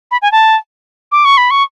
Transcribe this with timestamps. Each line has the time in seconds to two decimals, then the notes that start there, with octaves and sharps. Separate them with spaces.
0.11 B5
0.22 G#5
0.32 A5
1.12 D6
1.25 C#6
1.37 B5
1.51 C#6